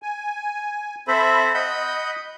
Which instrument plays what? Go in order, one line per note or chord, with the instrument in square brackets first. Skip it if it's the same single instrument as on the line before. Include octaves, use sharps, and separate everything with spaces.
[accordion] G#5
[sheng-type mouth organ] C4 A4 C5 [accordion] E5 B5
[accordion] D#5 [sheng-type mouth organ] F#5 B5 G6